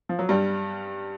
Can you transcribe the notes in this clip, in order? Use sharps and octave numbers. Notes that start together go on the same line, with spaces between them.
F3
F#3
G2 G3